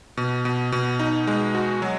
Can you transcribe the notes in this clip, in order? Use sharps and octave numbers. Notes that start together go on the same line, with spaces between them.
B2
B2
B2
D#4
G#3
F#4
F#3